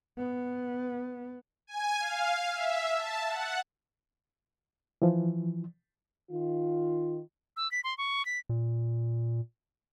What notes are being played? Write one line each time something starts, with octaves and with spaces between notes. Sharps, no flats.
B3
G#5
F5
E5
A5
F#5
E3 F3
D#3 F4
E6
B6
C6
C#6
B6
A#2